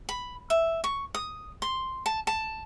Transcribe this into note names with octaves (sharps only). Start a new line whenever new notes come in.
B5
E5
C#6
D#6
C6
A5
A5